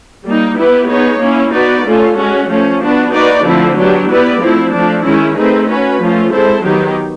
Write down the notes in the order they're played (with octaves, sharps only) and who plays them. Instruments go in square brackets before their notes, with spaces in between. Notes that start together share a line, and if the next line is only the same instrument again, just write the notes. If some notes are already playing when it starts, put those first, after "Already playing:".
[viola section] G3 A#3 D#4
B3 E4 G4 B4
B3 D#4 G#4 C#5
A#3 C#4 E4
B3 D#4 F#4 B4 D5
A3 C#4 F4 A4
G#3 C#4 F#4
F3 A3 C#4
B3 D4 F#4
A#3 D#4 F#4 B4 D5
D3 F3 A3 C4 E4
F#3 B3 D4 G4
B3 E4 G4 B4 D5
F3 A3 C4 E4
F3 A3 D4
D#3 G#3 C#4 E4
A3 C4 D#4 G#4 B4
C#4 F#4 B4
F3 A3 C#4 F4
G#3 C4 E4 A4 C5
D#3 F#3 B3 D#4 G4